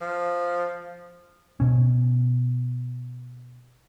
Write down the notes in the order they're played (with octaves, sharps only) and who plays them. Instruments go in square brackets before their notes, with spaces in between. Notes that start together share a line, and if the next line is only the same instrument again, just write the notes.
[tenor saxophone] F3
[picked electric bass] B2 C#4